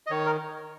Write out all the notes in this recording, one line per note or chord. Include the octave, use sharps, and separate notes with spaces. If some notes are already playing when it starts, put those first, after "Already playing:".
D#5
D#3 C#5
A#4